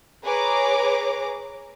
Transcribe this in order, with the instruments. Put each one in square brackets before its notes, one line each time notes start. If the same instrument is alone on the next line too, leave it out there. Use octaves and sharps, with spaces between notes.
[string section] G#4 B4 C#5 A#5 D6